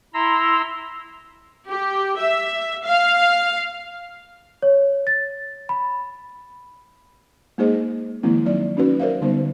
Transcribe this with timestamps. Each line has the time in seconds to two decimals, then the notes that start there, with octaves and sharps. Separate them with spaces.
0.14 E4 A#5 C6 E6
1.67 G4
2.15 E5
2.84 F5
4.62 C#5
5.07 A6
5.69 B5
7.58 G#3 A#3 D#4 G#4 C5 D#5
8.23 D#3 F3 G#3 A#3 C4 E4
8.46 F#3 D#4 D5
8.77 C#4 D#4 F#4 B4
9.00 A#4 C5 D5 E5 F5
9.21 D3 G3 B3 D#4 C5